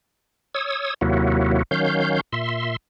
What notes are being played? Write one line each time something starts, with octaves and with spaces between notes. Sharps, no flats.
C#5 D#6 E6
D#2 C3 F#3 A#3 E4 F#4
D#3 F#3 C#4 F5 G6
A#2 E5 C6